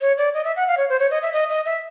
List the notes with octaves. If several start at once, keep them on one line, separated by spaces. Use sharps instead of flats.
C#5
D5
D#5
E5
F#5
F5
C#5
C5
C#5
D#5
E5
D#5
D#5
E5